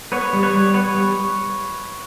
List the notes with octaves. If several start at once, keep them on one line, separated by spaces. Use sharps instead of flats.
B3 B4 C#5
G3
B4 C#5
G3
B3 B4 C#5
G3